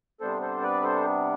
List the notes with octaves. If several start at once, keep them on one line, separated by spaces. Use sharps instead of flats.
C3 G3 B3 D4 A4 C5
A4 C5
B4 D5
A4 C5